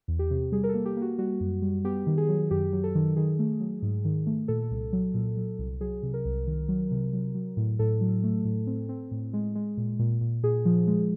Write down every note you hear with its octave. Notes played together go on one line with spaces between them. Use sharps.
E2
G4
C3
G3 G#4
A#4
A4
A#3
G4
A#3 F#4
G3 F#4
F#2
G3
B3 G4
D#3
G#4
F#3
F#2 G4
F#3
A4
D#3
D#3 G#4
A3
F#3
G#2
D#3
A3
A#2 A4
C2
F#3
A#2
F#3
C2
F#3 G#4
C3
A#4
C2
D#3
F#3
C3
F#3
F#3
A2
A2 A4
F#3
A3
A2
C4
C4
A2
G#3
G#3
A#2
A#2
A#2
A#2 G#4
F3
G#3